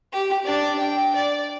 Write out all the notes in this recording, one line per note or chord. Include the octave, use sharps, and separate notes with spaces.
G4
D4 D5
G5
D5